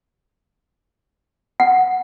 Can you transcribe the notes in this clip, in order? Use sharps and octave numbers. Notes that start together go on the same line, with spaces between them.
F#5